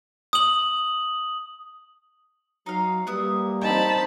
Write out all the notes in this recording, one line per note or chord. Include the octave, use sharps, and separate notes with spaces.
D#6 F#7
F#3 D#4 F5
G3 A#3 B3 E5 D#6
C4 D#4 G5 A5 B5